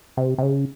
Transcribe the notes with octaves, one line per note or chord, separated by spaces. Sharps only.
C3
C3
C#3